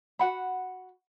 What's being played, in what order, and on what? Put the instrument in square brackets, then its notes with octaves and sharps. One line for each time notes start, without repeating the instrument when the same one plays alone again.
[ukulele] F#4 F#5 B5